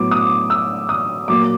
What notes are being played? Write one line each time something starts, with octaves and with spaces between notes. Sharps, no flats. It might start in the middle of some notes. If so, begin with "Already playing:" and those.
Already playing: A2 F#3 B3 D6
D#6
E6
D#6
A#2 F#3 A#3 D6